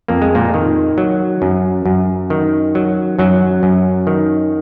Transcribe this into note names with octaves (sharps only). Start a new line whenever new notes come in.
F2 A#3
G#3
A#2 A#3
D#3
F#3
F#2
F#2
D#3
F#3
F#2 F#3
F#2
D#3